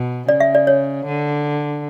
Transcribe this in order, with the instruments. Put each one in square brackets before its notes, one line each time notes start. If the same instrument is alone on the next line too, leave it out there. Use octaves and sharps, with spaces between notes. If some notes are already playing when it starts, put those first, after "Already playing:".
Already playing: [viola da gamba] B2
[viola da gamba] C#3 [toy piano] D5
[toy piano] E5
D5
C#5
[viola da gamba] D3